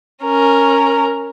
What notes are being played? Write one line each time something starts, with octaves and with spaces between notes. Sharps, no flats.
C#4 A#4